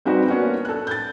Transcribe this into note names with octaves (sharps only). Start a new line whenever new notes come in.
G3 C4 D#4 F#4 G4 B4
A#3 B3 C#4 D4 F#4 F#5
A4 F#6
G6 A6